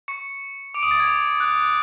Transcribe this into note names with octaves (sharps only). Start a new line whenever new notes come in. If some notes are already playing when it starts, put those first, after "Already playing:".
C#6 C#7
D6 D7
D#6 D#7
A6
G#6
D6
F#6